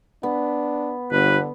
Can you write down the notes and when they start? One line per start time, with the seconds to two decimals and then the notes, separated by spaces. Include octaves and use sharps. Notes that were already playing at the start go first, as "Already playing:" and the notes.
0.23 B3 D4
1.12 G1 D3 B4